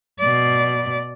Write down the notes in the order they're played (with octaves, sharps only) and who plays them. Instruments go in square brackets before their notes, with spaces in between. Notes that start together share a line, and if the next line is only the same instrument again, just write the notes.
[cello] B2 D5